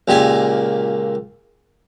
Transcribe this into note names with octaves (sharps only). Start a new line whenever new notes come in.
C#2 A#2 G4 G#5